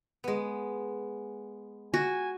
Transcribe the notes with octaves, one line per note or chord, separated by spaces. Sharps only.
G#3 B3
F#4 G#5